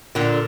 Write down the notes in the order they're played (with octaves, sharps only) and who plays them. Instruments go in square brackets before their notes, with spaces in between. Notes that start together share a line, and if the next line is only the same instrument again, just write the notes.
[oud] A#2 D3